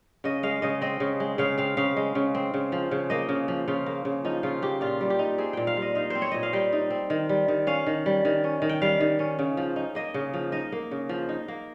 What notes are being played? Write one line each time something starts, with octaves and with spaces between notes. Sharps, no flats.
C#3 D#5
G#3 F5
C#3 D#5
C4 D#5
C#3
G#3
C#3 F5
C4 F5
C#3 F5
G#3
C#3
C4
C#3
F3
C#3
A#3 D#5
C#3
F3
C#3 F4
A#3
C#3
F3 D#4
C#3 F4
A#3 G4
A#2 F4
G3
G4
D#4
C4 G#4
A#2 G5
F5
G3
D#5
D#4 F5
C4 C5
C#5
A#2 D#5
F5
G3 G5
D#4
C4
D#3
G3
D#3
C#4 F5
D#3
G3
D#3
C#4
D#3
G5
G3 F5
D#3
C#4
C#3
F3
D#4
A#3 D#5
C#3
F3
D#4 D#5
A#3
C#3
F3
D#4
A#3